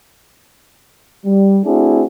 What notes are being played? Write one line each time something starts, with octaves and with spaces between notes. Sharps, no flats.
G3
A3 C4 D4 E4 F#4 G#4